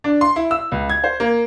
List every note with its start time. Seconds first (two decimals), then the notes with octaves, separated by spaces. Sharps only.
0.04 D4
0.21 C6
0.36 E4
0.51 E6
0.72 C#2
0.90 G#6
1.04 C5
1.20 A#3